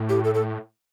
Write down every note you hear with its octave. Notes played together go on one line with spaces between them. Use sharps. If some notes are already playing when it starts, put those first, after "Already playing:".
Already playing: A2
G4
A4
A4